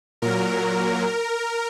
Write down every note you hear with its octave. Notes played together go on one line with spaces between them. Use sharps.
A#2 F#3 A#4